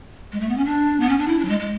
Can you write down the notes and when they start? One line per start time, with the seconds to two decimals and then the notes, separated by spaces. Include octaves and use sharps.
0.32 G#3
0.40 A3
0.49 B3
0.57 C#4
0.65 D4
1.00 B3
1.09 C#4
1.18 D4
1.28 E4
1.39 D4
1.45 F#3
1.49 G#3
1.60 G#3